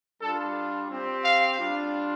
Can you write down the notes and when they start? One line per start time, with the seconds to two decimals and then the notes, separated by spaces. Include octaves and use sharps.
0.20 G3 D4 F4 A4
0.89 C4 G4
1.24 F5
1.59 G3 D4 F4